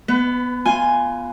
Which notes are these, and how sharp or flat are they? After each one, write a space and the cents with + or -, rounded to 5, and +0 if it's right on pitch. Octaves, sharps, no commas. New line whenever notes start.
B3 +0 B4 +30
F4 +0 G#5 +0